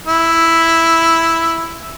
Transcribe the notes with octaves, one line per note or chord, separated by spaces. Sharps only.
E4